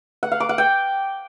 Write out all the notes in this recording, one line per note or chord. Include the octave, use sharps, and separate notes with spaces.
F#5
F5
D6
F#5
G5